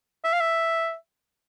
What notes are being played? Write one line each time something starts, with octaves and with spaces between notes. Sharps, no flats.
E5
F5
E5